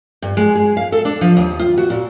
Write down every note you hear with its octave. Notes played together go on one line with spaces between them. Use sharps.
G2
G#3
G#4
F5
A4
D4
F3
D#2
F4
F#4
A#2